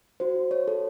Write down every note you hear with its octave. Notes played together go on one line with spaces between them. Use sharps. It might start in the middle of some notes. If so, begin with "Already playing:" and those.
F#4 C5
C#5
A4